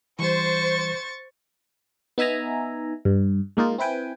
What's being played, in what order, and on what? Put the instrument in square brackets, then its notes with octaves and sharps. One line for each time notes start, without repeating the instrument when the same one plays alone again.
[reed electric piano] E3 G3 [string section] C5 [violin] C#6 A6
[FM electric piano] B3 D#4 E5 G#5 A#5
G2
G#3 A#3 D#4 F4
C4 E4 B4 G5 G#5